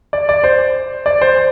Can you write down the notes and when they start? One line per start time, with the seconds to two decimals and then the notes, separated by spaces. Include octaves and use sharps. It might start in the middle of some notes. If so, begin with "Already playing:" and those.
0.13 D5
0.29 D5
0.44 C5
1.06 D5
1.21 C5